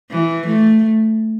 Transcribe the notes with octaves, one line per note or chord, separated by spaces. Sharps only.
E3
A3